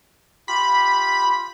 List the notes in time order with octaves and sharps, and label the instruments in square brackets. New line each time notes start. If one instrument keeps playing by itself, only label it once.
[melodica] F4 G4 [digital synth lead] B5